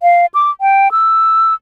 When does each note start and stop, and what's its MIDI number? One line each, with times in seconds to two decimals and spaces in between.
0.03 0.26 77
0.34 0.50 86
0.61 0.91 79
0.92 1.54 88